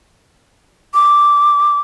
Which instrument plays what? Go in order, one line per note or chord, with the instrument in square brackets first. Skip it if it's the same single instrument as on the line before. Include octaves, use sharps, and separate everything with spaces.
[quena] D6